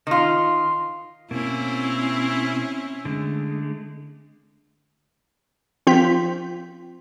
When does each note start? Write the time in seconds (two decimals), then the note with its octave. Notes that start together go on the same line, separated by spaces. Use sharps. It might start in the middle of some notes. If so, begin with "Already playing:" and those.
0.07 D#3 F4
1.31 B2 A#3 C4 C#4 E4
3.05 D3 G#3 A3
5.87 F3 C4 F4 G6 B6